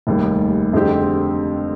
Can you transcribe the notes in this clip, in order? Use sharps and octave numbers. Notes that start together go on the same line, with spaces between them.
F1 D#2 D#3 G3
F2 D3 G#3 C4 G4